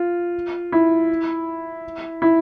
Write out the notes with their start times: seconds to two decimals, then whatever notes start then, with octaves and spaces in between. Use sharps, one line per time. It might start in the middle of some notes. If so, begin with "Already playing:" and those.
Already playing: F4
0.72 E4
2.22 E4